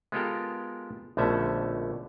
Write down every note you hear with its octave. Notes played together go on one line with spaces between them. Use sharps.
G#3 B3 F4 G4 A4 A#4
A#1 B2 D3 A3 C#4 E5